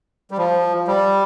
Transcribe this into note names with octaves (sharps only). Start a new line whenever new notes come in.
G3
F3
G3